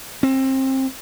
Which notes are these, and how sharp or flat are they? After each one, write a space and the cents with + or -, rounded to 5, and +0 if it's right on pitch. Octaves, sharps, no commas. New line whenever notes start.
C4 +25